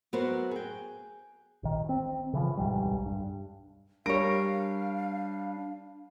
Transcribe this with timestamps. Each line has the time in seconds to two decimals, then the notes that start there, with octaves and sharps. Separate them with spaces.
0.13 F#3 B3 F#4 A#4 C5 E5
0.51 G#4 G5
1.63 A#1 D#3
1.89 C4
2.33 C#3 E3 F3
2.57 D1 B1 G#2 G3
3.06 G2
4.06 G3 D4 A#4 C#5 F5 D7